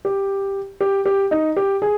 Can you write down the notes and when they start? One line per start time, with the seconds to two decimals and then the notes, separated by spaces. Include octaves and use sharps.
0.05 G4
0.81 G4
1.05 G4
1.31 D#4
1.57 G4
1.82 G#4